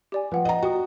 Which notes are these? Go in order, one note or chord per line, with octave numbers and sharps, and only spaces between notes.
G4 D5 G#5
F3 B4 F#5 G5
D#5 A#5
F#4 G5 D#6